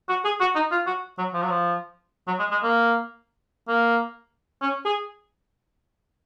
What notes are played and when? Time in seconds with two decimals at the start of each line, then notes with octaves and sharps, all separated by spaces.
0.09 F#4
0.25 G#4
0.40 F#4
0.55 D#4
0.72 F4
0.87 F#4
1.18 F#3
1.34 F3
1.42 F#3
1.50 F3
2.27 F#3
2.39 G#3
2.51 G#3
2.63 A#3
3.68 A#3
4.62 C#4
4.85 G#4